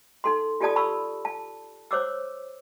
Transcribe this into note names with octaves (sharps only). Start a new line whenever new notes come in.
D#4 A4 C6
F4 G4 A4 D5 A5 D#6
A5 B5 C#6 E6
A5
C5 C#5 D6 E6